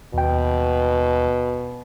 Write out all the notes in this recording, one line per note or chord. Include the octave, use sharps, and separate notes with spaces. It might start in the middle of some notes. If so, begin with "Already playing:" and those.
D#2 B2 G5